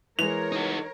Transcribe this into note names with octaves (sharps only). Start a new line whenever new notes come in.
E3 G#3 A#4 C#5 F7
D#4 F#4